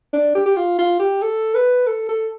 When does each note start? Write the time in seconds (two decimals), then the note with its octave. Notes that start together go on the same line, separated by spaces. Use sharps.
0.13 D4
0.35 G4
0.46 G4
0.57 F4
0.78 F4
1.00 G4
1.22 A4
1.54 B4
1.87 A4
2.09 A4